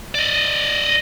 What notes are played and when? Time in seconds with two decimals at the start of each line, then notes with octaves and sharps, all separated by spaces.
0.15 D5 D#5